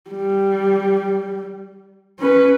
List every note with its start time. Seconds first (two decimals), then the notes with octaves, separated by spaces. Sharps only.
0.11 G3
2.20 C#4 B4